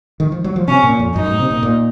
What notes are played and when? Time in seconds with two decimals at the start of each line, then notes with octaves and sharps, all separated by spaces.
0.20 D#3
0.32 F3
0.44 F#3
0.56 F3
0.68 C3 C#4
0.83 A#2
0.99 F2
1.16 F#2 D#4
1.27 A2
1.39 C3
1.51 A#2
1.63 A#2